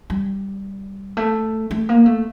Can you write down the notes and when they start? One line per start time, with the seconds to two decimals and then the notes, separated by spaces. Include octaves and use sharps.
0.10 G3
1.17 A3
1.71 A3
1.89 A#3
2.06 A3